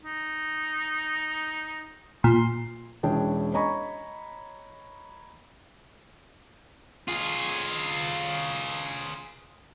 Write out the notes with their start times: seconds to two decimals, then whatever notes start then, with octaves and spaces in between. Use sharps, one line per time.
0.02 D#4
2.24 A#2 C6
3.03 E1 C#4 D4 E4 G#4 G5
3.53 C#5 D#5 G#5 A#5 B5 C#6
7.08 F4 G#4